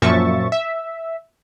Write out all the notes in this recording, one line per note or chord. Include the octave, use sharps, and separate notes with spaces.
F#2 A#2 F3 E5 C#6 A6
E5